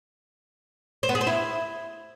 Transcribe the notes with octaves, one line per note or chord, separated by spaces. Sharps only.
C5
B3
G#4
C5
E4